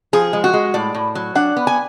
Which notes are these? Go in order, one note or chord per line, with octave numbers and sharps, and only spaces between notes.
F3 G#4
G#3
F#4
G#3
A2 D5
A2
F#3
D4 F#5
B3
G#5